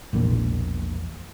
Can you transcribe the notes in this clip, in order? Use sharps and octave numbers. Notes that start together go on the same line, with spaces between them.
E1 A#1 E2 A#2